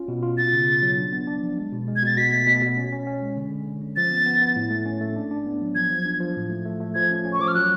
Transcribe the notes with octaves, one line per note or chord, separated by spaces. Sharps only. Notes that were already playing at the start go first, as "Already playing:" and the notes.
Already playing: C#4 F4
B2
F4
B3 A6
C#3
C#3
F#3
D4
B3
D4
F3
G#3
B2
G#3
G#6
B2 A6
B2 B6
A3
B2
B2
C#4
C#4
C#4
G#3
D3
D3
D3
C#4
F3 A6
B3
B3
B3
A2
A3
C#4
A3
D4
D4
B3
F#3
F3 G#6
F3
D4
F3
A2
A3
A3
A3
F3 G#6
C#4
C#4
C#6
F3 D6
F6
F#3 F#6